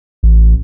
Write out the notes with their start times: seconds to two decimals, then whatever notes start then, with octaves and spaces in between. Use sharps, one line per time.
0.23 A1